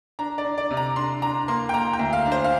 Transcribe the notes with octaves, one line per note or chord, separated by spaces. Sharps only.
D4 A#5
D5
D4
D5
C3
A#5
D4 C6
D4 A#5
A#3 C6
G5
A#3 A#5
G5
D2
F5
D4
C5
F5